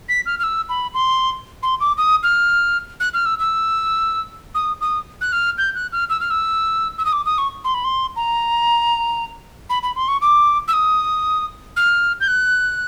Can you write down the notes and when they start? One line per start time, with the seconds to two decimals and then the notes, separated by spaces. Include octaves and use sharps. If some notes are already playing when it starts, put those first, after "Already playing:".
0.09 B6
0.26 F6
0.39 F6
0.43 E6
0.69 B5
0.94 C6
1.63 C6
1.80 D6
1.98 D#6
2.23 F6
3.00 F#6
3.14 F6
3.26 E6
3.39 E6
4.55 D#6
4.81 D#6
5.21 F#6
5.32 F6
5.58 G6
5.75 F#6
5.92 F6
6.09 E6
6.20 F6
6.30 E6
6.98 E6
7.05 D#6
7.12 D6
7.26 D#6
7.38 C#6
7.64 C6
7.74 B5
7.84 C6
8.16 A#5
9.70 B5
9.83 B5
9.96 C6
10.08 C#6
10.21 D6
10.68 E6
10.73 D#6
11.76 F6
12.20 G6
12.28 F#6